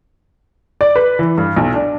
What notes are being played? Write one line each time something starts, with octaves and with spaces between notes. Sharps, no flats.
D5
B4
E3
G2
B1
D4